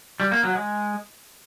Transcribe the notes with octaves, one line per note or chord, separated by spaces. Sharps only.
G3
A#3
F#3
G#3